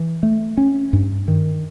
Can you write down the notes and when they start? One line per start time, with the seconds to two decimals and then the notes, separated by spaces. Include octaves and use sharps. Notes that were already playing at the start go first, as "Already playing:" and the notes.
Already playing: E3
0.23 A3
0.57 C#4
0.93 G2
1.28 D#3